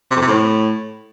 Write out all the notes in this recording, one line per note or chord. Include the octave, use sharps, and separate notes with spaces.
C3
F2
C3
A2